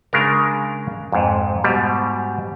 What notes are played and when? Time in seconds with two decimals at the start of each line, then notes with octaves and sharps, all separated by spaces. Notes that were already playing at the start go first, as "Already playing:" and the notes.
0.13 C#3 G#3 D4 A#4
1.12 F2 G#2
1.64 G#2 B2 G3